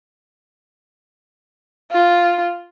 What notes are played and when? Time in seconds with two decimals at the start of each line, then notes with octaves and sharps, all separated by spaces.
1.92 F4